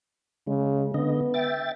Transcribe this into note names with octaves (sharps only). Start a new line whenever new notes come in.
C#3 G#3
D3 B3 D#5
E5 G5 A6